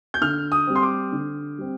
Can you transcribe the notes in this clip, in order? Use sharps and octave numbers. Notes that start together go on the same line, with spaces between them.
G6
D3 F6
D#6
G3 C4
C6
D6
D3
G3 C4